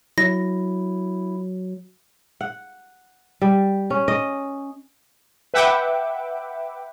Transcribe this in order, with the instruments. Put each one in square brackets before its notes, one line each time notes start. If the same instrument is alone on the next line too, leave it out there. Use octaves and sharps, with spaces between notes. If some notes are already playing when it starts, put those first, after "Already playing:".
[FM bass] F#3 [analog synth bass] E4 [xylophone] A#6
[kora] F#5
G3
C#4
D#5
[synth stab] B4 E5 F#5 G5 D6